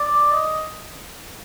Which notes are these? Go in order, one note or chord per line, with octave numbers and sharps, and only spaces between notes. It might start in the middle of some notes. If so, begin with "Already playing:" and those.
Already playing: D5
D#5